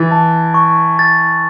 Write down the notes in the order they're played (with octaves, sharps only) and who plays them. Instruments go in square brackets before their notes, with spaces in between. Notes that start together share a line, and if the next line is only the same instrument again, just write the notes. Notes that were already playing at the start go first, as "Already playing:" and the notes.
Already playing: [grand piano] E3 [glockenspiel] A6
[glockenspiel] A5
C#6
A6